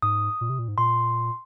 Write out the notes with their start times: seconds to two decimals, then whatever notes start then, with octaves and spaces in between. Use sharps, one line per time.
0.02 G#2 D#6
0.41 A#2
0.50 C3
0.59 A#2
0.68 G#2
0.78 A#2 C6